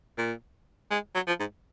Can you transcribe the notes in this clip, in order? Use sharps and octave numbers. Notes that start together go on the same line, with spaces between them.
A#2
G#3
F#3
F3
G#2